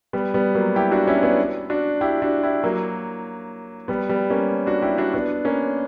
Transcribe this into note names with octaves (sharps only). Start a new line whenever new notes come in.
G3 B3
G3 B3
F#3 A#3
E4 G4
D4 F#4
C#4 E4
B3 D4
D4 F#4
E4 G4
D4 F#4
E4 G4
F#3 A#3
G3 B3
G3 B3
A#3 C#4
D4 F#4
E4 G4
D4 F#4
B3 D4
A#3 C#4